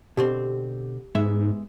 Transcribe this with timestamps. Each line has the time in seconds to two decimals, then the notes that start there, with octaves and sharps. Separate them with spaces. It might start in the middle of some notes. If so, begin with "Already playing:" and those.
0.17 B2 D3 C4 G4
1.15 G#2 G#3 B3 E5